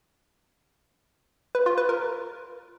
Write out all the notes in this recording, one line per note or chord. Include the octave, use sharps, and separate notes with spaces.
B4
F4
B4
A#4